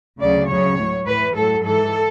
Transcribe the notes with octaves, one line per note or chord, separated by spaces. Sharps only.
D2 C#3 F#3 D5
D2 C#3 F#3 C#5
A2 F#3
A2 E3 B4
A2 F#3 A4
G#2 E3 A4